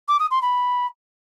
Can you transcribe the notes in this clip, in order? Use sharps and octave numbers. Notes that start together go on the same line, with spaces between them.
D6
D#6
C6
B5